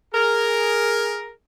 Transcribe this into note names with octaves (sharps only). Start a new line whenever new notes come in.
G#4 A#4